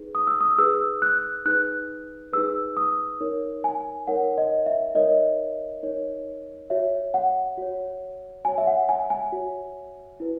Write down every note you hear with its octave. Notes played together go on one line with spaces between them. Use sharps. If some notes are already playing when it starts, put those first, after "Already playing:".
Already playing: D#4 G#4 B4
D#6
E6
D#6
D#4 G#4 B4 E6
F#6
D#4 G#4 B4 F#6
D#4 G#4 B4 E6
D#6
D#4 A#4 C#5
G#5
D#4 A#4 C#5 F#5
D#5
E5
D#4 A#4 C#5 D#5
D#4 A#4 C#5
F#4 C#5 E5
F#5
F#4 C#5
F#4 C#5 G#5
E5
F#5
G#5
G#5
F#4 C#5
E4 B4